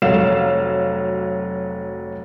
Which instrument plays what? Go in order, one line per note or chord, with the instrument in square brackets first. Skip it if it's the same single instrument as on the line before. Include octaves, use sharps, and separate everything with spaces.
[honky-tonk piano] F1 F#3 F5 E7